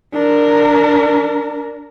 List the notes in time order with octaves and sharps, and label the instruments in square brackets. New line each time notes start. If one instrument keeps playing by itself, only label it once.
[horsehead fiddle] D4 A#4